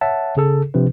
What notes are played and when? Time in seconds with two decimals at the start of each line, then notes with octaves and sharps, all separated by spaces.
0.01 C#5 E5 F#5 A5
0.37 C#3 G#4 A4
0.74 C3 F3 D4 B4